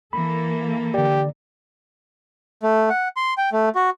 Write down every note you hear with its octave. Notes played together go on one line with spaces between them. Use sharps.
E3 A#3 A4 B5
D3 G4 D5
A3
F#5
C6
G5
A3
F#4